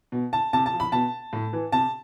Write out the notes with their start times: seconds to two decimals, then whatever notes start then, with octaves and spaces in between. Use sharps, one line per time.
0.12 B2
0.33 A5
0.53 C3 A5
0.66 A5
0.73 F3
0.80 B5
0.92 B2 A5
1.33 A2
1.53 E3
1.72 C3 A5